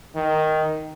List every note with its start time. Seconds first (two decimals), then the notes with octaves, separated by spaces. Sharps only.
0.15 D#3